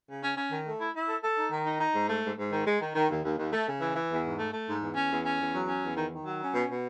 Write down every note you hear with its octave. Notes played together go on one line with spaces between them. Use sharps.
C#3
C#4
C#4
D#3
A3
E4
E4
A4
A4
D#4
D#3
D#4
D#4
G#2
A3
G#2
G#2
D#3
G#3
D#3
D#3
D#2
D#2
D#2
A3
C#3
E3
E3
E2
G#2
A3
A3
G#2
E2
C#4
E2
C#4
E2
F#3
C#4
E2
D#3
D#3
F#3
C#4
B2
B2